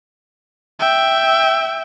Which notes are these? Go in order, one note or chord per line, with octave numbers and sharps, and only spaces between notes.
E5 G5